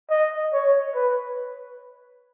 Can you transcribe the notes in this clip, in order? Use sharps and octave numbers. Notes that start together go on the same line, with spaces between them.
D#5
C#5
B4